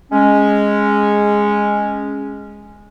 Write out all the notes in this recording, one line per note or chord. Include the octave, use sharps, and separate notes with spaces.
G#3 C#4